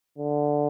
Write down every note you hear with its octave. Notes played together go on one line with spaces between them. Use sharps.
D3